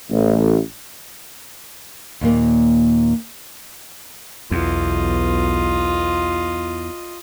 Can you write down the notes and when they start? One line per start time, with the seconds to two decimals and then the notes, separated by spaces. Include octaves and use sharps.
0.10 A1
2.21 D#2 A#2 A#3
4.51 B1 E2 F4 D#5